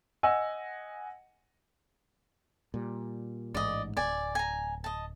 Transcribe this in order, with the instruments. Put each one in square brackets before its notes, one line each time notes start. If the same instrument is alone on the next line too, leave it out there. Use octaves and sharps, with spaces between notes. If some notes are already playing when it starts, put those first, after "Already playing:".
[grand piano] D#5 F#5 G#5 E6
[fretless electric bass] A#2 G3
[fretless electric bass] A1 G#2 [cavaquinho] D5 D#5
[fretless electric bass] D1 [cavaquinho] D5 G#5
[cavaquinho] G#5 A#5
D#5 A5